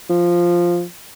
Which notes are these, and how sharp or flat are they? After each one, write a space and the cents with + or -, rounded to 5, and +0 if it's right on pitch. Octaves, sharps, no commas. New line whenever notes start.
F3 +0